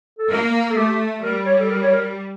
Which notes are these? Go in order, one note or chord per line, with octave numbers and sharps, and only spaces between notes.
A4
A#3 A#4
A4
A3 G4
G3 A#4
C#5
A4
A#4
C#5
A#4